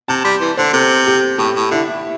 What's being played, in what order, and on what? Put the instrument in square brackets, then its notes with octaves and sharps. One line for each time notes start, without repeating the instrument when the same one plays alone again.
[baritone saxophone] C3 [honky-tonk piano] A5
[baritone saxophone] G3 [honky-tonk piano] C6
[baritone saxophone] E3
[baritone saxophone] D3 [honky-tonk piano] C5
[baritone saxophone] C3 [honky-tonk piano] A4
[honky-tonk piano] G4
[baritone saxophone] A2 [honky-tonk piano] G4
[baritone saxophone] A2
[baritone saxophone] D3 [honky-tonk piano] E4